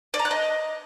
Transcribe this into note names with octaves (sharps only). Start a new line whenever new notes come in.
D5
A#5
F#6
D#5